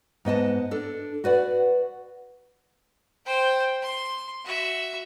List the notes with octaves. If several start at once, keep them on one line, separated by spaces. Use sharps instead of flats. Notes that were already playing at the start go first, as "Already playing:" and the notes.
G#2 B3 D#5 A5
D4 A4
F#4 B4 D5 F#5
C5 G5
C6
F#4 E5